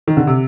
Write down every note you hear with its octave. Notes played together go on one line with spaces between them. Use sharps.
D#3
D3
C3